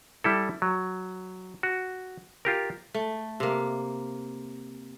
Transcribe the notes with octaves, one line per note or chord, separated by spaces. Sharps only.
G3 E4 A4
F#3
F#4
F4 G4 A#4
A3
C3 A#3